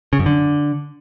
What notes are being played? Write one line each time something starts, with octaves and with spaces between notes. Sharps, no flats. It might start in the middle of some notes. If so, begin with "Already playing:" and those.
C#3
F#2
D3